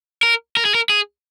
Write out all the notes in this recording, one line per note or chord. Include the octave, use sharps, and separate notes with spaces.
A#4
A#4
G#4
A#4
G#4